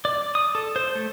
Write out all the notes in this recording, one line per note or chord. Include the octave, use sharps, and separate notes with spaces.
D5
D#6
A4
C5
A3